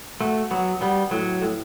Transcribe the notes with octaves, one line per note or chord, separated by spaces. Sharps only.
A3 F#4
F#3 B3
G3 B3
A2 F#3
A2